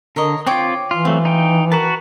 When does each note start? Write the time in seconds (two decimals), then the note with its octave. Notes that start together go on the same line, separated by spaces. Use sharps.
0.16 D3 A#4 C#5 D#5
0.47 C4 F4 C#5 G5 D6
0.91 E3 F4
1.05 F#3 A3 C4 F4
1.25 D#4 G5
1.72 F#4 A#4 B4 A5